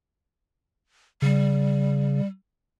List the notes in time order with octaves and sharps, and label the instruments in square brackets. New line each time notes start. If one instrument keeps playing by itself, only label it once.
[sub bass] C#3 [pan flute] G3